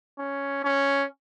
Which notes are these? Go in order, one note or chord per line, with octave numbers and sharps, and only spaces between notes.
C#4
C#4